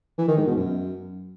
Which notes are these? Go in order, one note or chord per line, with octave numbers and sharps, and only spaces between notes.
E3
D#3
G#2
B2
F#2